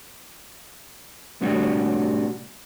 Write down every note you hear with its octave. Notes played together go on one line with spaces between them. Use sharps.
C2 A2 G3 B3 D4 F#4